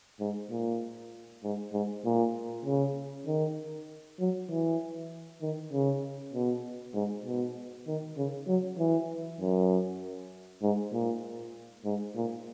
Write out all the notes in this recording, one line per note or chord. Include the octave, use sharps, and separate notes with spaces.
G#2
A#2
G#2
G#2
A#2
C#3
D#3
F#3
E3
D#3
C#3
B2
G#2
B2
D#3
C#3
F#3
E3
F#2
G#2
A#2
G#2
A#2